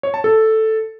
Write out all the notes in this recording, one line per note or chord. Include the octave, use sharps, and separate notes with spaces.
C#5
A5
A4